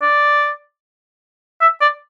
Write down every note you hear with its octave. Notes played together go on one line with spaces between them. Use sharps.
D5
E5
D5